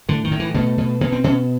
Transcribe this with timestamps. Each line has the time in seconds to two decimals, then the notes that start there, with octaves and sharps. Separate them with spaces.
0.09 A2 D3
0.24 D#3
0.31 A2
0.40 E3
0.54 B2 A3
0.78 B2
1.01 B2 A#3
1.12 C4
1.24 B2 C#4